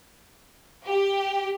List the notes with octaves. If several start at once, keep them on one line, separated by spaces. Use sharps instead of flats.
G4